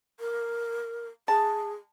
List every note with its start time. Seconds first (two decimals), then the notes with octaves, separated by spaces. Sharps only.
0.20 A#4
1.28 G#4 A5